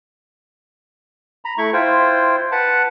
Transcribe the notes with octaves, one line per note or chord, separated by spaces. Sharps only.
A#5 B5
A3 E4 B5 C#6
E4 F4 C5 G5
B4 F#5 A5 B5